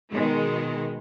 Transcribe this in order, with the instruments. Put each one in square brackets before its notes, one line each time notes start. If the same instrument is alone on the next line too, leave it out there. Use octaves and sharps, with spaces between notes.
[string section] B2 D#3 G#3